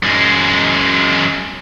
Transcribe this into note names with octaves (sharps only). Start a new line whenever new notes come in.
F#2 G#3